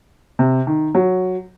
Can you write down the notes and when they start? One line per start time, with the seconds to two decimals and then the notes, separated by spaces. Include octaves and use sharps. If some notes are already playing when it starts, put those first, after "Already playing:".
0.39 C3
0.67 D#3
0.95 F#3